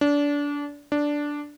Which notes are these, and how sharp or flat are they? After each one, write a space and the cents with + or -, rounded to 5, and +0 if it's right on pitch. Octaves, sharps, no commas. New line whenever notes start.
D4 -25
D4 -5